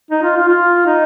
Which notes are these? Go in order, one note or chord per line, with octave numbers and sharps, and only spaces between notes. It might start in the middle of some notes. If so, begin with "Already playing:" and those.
D#4
F4
F4
F4
D#4